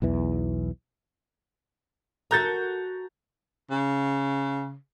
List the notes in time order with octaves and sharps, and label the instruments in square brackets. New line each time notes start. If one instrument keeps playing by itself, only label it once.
[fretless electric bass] B1 E2 E3
[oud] F#4 A4 A#4 [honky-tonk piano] A#5 G6 A6
[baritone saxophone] C#3